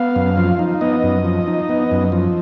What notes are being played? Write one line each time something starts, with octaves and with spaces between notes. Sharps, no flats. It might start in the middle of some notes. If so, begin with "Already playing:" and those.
Already playing: B3 F5
F#2
F3
D#4
B3 D#5
F#2
F3
D#4
B3
F#2
F3